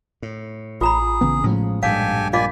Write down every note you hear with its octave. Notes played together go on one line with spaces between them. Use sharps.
A2
A1 F4 G#4 A#5 B5
C#3 E3 B3
A2 F3 G#3 C#4
A#1 G2 G#3 G4 A4 F5 G#5
A#3 F4 D5 D#5 F5 G#5